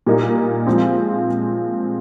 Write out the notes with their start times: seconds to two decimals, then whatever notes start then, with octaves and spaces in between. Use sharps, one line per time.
0.07 A#2 G3 A#3 D#4
0.66 F3 G#3 C4 F4 G#4